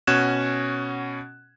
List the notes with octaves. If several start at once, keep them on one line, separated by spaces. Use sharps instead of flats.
B2 C#4 F#4 F#6 G#6 E7